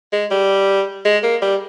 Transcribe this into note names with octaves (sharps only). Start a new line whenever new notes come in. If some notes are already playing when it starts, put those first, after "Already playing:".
G#3
G3
G#3
A#3
G3